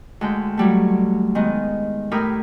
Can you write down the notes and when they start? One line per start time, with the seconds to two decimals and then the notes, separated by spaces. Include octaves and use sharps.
0.21 D2 G#3 G5
0.57 F#3 G3 A3
1.35 D#3 G#3 B3
2.11 A2 G4 A#4 B5 D#6 F6